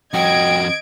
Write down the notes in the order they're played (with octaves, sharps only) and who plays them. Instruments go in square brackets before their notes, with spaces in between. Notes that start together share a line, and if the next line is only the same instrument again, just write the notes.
[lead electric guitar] F2 F#4 [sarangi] D#5 [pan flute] G5 [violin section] G#6 D7